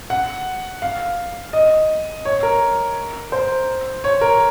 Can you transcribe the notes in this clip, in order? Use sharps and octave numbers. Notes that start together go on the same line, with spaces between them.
F#5
F5
D#5
C#5
A#4
C5
C#5
A#4